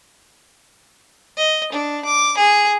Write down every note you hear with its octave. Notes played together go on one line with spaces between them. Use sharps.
D#5
D4
D6
G#4